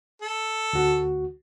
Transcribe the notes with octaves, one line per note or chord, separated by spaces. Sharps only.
A4
D2 F#4